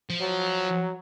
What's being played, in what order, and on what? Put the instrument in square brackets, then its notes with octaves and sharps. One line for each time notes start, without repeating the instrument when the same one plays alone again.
[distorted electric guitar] F3
[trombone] F#3